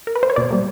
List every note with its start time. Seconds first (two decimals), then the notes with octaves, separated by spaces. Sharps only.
0.07 A#4
0.15 B4
0.23 C5
0.30 C#5
0.36 B2 D5
0.51 G3 A#3